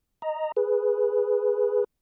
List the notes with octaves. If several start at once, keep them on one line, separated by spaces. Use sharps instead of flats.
D#5 A#5
G#4 B4